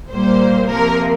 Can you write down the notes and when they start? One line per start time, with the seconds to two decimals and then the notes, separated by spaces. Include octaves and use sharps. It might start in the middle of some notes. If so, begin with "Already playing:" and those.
0.11 A#2 G3 A#3 C5
0.68 C3 F3 A#3 A#4